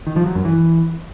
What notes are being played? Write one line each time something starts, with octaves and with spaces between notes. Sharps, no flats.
D#3
F3
F#3
F#2
E3